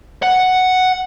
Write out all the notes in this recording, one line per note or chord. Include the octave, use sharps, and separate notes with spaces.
F#5